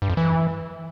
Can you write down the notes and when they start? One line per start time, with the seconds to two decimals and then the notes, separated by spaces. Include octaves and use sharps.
0.02 G2
0.10 F2
0.17 E3